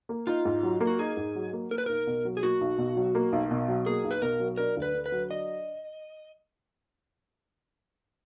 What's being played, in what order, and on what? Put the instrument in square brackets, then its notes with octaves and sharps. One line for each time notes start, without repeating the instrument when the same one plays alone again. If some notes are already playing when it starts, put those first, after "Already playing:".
[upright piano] A#3
[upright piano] D#4 [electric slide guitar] F4
[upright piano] G#2
F#3
A#3
[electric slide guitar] F#4
[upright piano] D#4 [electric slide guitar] G#4
[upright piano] G#2
F#3
A#3
[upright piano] A#3 [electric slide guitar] A#4
[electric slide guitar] B4
[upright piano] B1 [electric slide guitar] A#4
[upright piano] B2
F#3
[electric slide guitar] G#4
[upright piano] A#3 [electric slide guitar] F#4
[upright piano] B1
B2
F#3
A#3
B1
B2
F#3
[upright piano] A#3 [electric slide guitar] G#4
[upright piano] B1
[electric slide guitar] B4
[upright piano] B2 [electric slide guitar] A#4
[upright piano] F#3
[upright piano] D4 [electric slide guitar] A#4
[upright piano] D2
[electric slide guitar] B4
[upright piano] D3
[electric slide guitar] B4
[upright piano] F#3
[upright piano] D4 [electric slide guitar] D#5